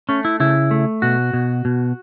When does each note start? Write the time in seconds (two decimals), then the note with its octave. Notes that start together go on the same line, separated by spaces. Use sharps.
0.09 A3 C#4
0.25 E4
0.40 C#3 E4
0.71 A3
1.02 B2 F#4
1.34 B2
1.65 B2